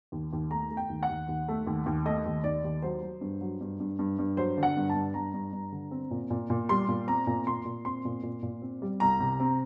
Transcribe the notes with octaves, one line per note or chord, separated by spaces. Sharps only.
D#2
D#2
A3 A#5
A3
G5
D#2
F#5
D#2
D#2
A3
D#2
D#2
A3 D#5
D#2
D#2 D5
D#2
F#3 C5
F#3
G2
F#3
G2
G2
G2
G2
F#3 C5
D3
F#5
G2
A5
G2
G2 A#5
G2
G2
D3
C4
A#2
A#2
A#2
G3 C6
A#2
C4 A#5
A#2
A#2 C6
A#2
C4 C6
A#2
A#2
A#2
C4
G3
C2 A#5
C3
C4